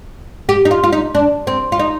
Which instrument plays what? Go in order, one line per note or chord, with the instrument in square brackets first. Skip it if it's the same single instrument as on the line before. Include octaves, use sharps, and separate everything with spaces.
[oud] G4
D#4
F4
F4
D#4
D4
C4
F4
D#4